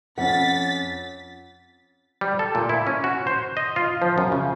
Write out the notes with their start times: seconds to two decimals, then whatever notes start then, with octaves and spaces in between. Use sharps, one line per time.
0.18 F2 C#4 F#5 A6 B6
2.21 G3
2.39 A4
2.55 A#2
2.69 E4
2.87 C#4
3.04 F#4
3.27 C5
3.57 D#5
3.76 F4
4.02 F3
4.18 F#2
4.32 C#3